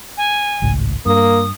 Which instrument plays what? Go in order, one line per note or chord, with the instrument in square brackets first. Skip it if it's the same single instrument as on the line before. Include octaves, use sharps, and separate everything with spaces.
[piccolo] G#5
[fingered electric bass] G#1 C#2 A2
[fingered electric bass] G2 [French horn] A#3 [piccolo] D#6